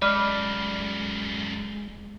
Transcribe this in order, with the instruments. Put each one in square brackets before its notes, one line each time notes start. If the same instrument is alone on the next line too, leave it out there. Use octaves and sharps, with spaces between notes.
[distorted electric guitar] F#2 A3 [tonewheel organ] G#3 [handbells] D5 [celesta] B5 D6 F6